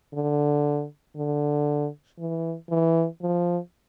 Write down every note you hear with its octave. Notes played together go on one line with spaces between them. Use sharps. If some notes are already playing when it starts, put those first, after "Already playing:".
D3
D3
E3
E3
F3